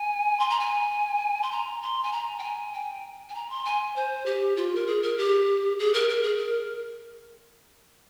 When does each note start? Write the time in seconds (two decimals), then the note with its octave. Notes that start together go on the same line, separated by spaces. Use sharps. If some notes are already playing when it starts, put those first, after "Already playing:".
Already playing: G#5
0.40 C6
0.50 A#5
0.60 G#5
1.43 C6
1.52 A#5
1.83 C6
2.04 G#5
2.12 A#5
2.38 G5
2.43 G#5
2.74 G5
3.29 G#5
3.35 A#5
3.50 C6
3.65 G#5
3.96 C5
4.26 G4
4.57 F4
4.75 A#4
4.87 G#4
5.03 A#4
5.18 G4
5.79 G#4
5.94 A#4
6.09 A#4
6.23 G#4
6.37 A#4